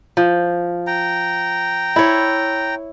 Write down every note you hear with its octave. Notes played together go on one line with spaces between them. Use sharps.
F3
G5 A#5
E4 C#5